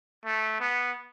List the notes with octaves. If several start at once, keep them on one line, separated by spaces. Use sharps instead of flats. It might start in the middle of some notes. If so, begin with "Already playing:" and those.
A3
B3